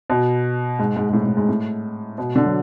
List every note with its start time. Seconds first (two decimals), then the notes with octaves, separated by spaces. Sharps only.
0.10 B2
0.79 G#2
0.96 G#2
1.09 G#2
1.13 A2
1.25 A2
1.37 G#2
1.49 A2
2.18 B2
2.36 D3
2.46 F#3